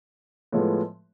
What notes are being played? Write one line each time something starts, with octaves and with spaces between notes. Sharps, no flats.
A2 F3 G#3 B3